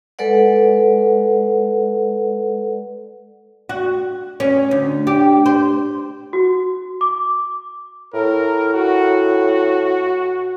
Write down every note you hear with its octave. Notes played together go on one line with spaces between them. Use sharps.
G#3 A4 B4 D5 F#5
F#4
C#4
D2
G4
C5
F#4
D6
A2 A#4
F#4